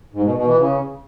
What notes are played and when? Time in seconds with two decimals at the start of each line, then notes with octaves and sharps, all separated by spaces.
0.13 G#2
0.24 B2
0.35 B2
0.46 E3
0.57 C#3